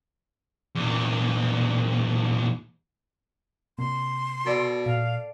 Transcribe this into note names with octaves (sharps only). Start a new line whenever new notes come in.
E2 A#2
C3 A#3 C6
B2 A4 D5
A#2 F5